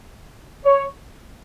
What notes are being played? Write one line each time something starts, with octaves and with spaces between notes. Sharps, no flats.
C#5